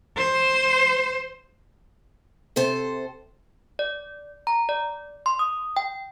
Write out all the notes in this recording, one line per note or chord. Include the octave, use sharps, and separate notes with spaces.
C5
C3 A4 C5
D5
A#5
D5
C6
D#6
G5